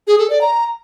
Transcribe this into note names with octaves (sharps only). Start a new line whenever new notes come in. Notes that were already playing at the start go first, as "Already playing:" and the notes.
G#4
A4
D5
A#5